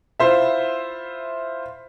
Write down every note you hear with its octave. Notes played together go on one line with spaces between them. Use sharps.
E4 F4 C5 E5